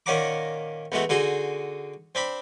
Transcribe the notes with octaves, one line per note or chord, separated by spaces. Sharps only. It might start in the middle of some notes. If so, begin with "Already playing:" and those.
A#2 D#3 C#4 F#5 A#5 D6
E2 G#3 A3 F#4
D3 D#4 F#4 G#4 C6
C4 D4 B5